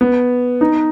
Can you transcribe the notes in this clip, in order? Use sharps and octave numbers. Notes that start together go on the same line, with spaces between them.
B3
D#4